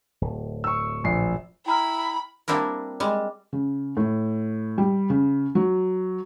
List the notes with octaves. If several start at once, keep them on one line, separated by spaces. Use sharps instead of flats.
D1
C#6 E6
A#1 C7
E4 G5 A#5 B5 F6
G3 A#3 C4 D4 E4 A#4
G3 G#3
C#3
A2
G3
C#3
F#3